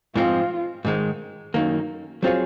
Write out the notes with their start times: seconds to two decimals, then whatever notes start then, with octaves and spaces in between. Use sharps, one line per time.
0.15 G#2 F3 C4 F4
0.85 G#2 D#3 G#3
1.54 F#2 D#3 A#3 D#4
2.23 F#3 C4 F4 G#4 C#5